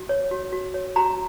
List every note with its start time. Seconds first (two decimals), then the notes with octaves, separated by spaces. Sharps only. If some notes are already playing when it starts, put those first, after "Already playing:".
Already playing: F#4
0.09 C#5
0.31 F#4
0.52 F#4
0.74 C#5
0.96 F#4 A#5